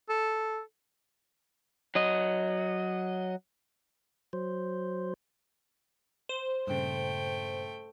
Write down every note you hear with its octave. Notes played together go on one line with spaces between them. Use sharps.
A4
F#3 D#5
F#3 C5
C5
G2 A#2 C#3 A3 G5